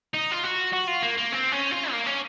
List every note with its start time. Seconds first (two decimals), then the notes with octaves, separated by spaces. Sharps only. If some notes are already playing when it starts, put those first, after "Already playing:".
0.14 D#4
0.31 F4
0.43 F#4
0.73 F#4
0.88 F4
1.03 A#3
1.18 A#3
1.32 C4
1.52 C#4
1.72 F4
1.91 A#3
2.07 C#4